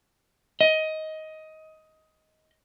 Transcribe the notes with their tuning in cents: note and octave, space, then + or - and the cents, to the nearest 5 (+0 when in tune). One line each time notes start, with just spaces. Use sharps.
D#5 +15